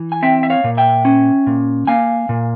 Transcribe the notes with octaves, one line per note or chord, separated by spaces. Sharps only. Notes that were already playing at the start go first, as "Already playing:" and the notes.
Already playing: E3
G#5
C4 E5 G5
E5
C#5 F5
A#2
E5 G5
C#4
A#2
A#3 F5 G#5
A#2